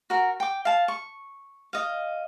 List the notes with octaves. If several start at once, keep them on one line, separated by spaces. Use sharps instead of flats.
F#4 A#4
G5 D6
F5 A5
C#6
D#5 F5